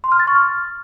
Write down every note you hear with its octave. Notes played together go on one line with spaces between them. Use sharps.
C6
F6
A6
C#6
F6